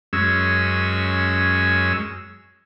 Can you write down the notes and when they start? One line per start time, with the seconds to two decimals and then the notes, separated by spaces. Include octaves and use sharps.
0.13 F#2 G#3 C#4 E6